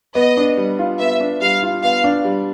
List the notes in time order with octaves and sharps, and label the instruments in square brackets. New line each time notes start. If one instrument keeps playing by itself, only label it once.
[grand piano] B3 [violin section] D#5
[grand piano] D4
G3
F4
[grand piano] B3 [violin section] E5
[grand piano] D4
[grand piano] G3 [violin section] F5
[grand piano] F4
[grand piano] B3 [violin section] F5
[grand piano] D4
G3